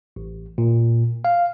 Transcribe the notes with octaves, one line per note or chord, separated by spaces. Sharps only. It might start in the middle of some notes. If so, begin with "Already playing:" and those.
A1
A#2
F5